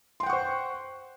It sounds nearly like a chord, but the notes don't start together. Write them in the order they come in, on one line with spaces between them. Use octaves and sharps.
C6 G5 F#5 C#6 C5